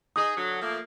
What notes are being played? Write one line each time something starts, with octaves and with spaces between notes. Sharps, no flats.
D#4 G#4 D#6
D3 F#3
F3 A3 A#3